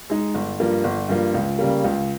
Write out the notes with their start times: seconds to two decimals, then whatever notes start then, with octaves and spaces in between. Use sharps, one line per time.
0.10 G#3 D#4
0.34 G1
0.60 G2 F3 A#3
0.84 G1
1.09 G2 F3 A#3
1.34 C#2
1.59 C#3 G3 A#3
1.84 C#2